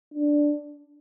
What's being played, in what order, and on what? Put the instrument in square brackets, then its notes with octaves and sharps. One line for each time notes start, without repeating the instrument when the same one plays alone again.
[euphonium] D4